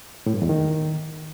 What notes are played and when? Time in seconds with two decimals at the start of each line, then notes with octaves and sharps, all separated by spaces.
0.26 A2
0.34 G2
0.42 E2
0.49 D#3